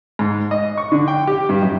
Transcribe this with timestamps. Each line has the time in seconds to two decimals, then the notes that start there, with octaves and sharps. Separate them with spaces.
0.19 G#2
0.51 D#5
0.77 C#6
0.92 D3
1.08 G5
1.27 G4
1.49 G2
1.62 F#2